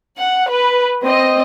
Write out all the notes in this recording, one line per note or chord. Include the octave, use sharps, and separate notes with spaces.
F#5
B4
C4 D#5